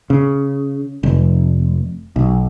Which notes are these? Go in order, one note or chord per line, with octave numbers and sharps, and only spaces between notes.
C#3
F1
B1